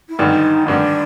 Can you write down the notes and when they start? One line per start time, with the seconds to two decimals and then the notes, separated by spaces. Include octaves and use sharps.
0.09 E4
0.19 G#1 G2 D3 D#4
0.66 G#1 G2 D3 D4